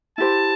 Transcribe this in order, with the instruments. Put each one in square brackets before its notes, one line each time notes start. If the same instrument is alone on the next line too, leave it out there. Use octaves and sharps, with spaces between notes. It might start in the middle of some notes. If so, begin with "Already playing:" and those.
[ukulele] E4 G4 C5 [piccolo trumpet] A5